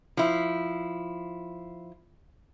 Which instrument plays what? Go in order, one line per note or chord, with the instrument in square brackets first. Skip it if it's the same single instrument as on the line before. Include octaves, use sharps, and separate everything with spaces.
[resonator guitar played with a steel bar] F3 E4